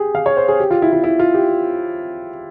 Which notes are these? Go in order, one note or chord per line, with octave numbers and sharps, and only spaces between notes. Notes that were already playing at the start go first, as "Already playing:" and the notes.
Already playing: G4 G#4
F5
C#5
C5
G#4
G4
F4
E4
F4
E4
F4
G4